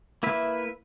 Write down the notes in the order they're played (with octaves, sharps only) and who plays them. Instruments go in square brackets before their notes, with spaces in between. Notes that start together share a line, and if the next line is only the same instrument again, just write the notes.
[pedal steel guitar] A#3 E4 B4 E5